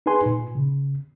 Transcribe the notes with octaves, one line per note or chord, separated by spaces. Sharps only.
D#4 G#4 B4 G#5 C6
A#2
C#3